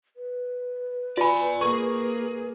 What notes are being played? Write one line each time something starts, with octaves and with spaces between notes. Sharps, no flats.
B4
F4 D5 G#5 B5
A#3 G#4 C#6